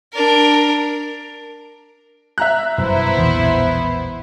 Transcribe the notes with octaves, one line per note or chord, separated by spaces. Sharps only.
D4 A#4
E5 A#5 F#6
G1 F#2 B2 B3 E4 C5
E1 A#1 E3